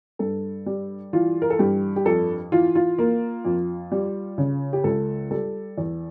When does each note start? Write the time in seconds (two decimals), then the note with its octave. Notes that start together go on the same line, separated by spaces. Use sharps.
0.19 G2 A4
0.66 G3
1.13 E3 F4
1.42 A#4
1.50 A4
1.59 G2 G4
1.96 G4
2.05 F2 A4
2.52 E3 F4
2.75 F4
2.99 A#3
3.45 F2
3.92 G3
4.38 C#3
4.73 G4
4.84 C#2 A4
5.31 G3 A4
5.78 E2